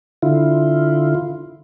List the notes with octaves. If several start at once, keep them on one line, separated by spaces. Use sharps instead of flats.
D3 E4 F4